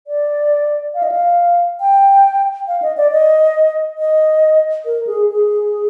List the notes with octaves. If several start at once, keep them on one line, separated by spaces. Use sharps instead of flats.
D5
F5
D#5
F5
G5
F5
D#5
D5
D#5
D#5
A#4
G#4
G#4